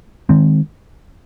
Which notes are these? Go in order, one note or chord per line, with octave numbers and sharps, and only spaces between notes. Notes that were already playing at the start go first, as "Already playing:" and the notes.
D#3 G#3 C4